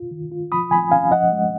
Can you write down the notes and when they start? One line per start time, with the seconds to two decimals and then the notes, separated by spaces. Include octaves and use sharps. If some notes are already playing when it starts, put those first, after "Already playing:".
Already playing: F4
0.11 D#3
0.32 F4
0.52 F3 B5 D#6
0.71 F3 G#5 B5
0.91 C#4 F5 G#5
1.11 F3 D#5 F#5
1.32 G#3